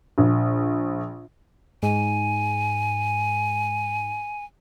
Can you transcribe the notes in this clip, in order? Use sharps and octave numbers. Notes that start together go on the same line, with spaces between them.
A#1
G#2 G#5